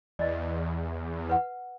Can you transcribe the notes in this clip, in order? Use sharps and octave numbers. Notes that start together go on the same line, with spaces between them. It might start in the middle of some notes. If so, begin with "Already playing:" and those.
E2 D5 D#5
B4 F#5